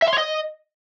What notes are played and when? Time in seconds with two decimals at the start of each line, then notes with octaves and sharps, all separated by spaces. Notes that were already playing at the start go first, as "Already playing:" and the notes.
0.02 E5
0.08 C6
0.13 C#5
0.18 D#5